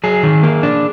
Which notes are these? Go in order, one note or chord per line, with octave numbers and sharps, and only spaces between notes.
F#3 G#4
D#3
A#3
D4